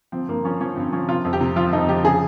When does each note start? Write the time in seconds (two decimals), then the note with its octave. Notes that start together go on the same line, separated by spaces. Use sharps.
0.12 F3 C4
0.28 G2 A#3
0.44 F3 C#4
0.60 F3 C#4
0.76 G2 C4
0.92 F3 C#4
1.08 C3 F4
1.25 F2
1.33 G4
1.41 C3
1.56 F3 F4
1.73 F2 D#4
1.89 F3 G4
2.04 C#3 G#4